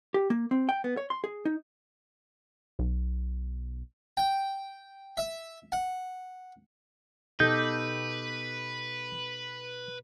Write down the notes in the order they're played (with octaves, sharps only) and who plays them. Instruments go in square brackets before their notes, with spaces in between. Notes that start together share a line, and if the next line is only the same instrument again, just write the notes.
[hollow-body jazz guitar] G4
A#3
C4
G5
B3
C#5
C6
G#4
D#4
[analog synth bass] B1
[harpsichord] G5
E5
F#5
[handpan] B2 G4 A4 [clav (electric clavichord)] D#4 [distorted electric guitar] B4 [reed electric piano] G6